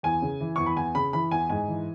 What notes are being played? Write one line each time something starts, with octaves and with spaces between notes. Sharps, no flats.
E2 G#5
C#3
E3
E2 C#6
B5
E2 G#5
C#3 B5
E3 B5
E2 G#5
G#2 G#5
E3